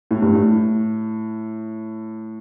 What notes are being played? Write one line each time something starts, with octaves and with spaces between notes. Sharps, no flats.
A2
G2
A2